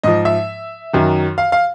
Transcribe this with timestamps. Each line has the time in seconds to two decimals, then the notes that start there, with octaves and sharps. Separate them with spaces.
0.03 G#2 F3 D#5
0.25 E5
0.93 F#2 D#3 F#3
1.38 F5
1.52 F5